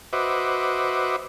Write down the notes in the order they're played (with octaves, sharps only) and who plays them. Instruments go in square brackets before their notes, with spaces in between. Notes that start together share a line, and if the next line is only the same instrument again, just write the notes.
[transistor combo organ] F#4 B4 C5 D#5 E5 D6